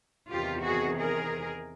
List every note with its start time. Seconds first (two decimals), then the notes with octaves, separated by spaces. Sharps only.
0.30 E2 C3 D#3 F4 G4
0.64 F#4 G#4
0.98 G#4 A#4